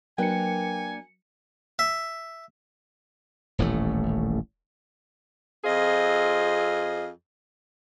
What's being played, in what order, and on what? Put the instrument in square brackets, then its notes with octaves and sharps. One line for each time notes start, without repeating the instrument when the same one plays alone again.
[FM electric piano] F#3 C#7 [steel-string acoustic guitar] A#3 D4 A#4 [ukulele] B4 G5 [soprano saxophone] G#5
[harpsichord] E5
[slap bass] D#1 A1 A2 A3
[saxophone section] F2 C4 F4 G#4 D#5